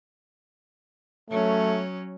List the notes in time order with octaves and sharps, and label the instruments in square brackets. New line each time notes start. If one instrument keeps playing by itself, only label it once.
[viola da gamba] F#3 C#4 [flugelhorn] A3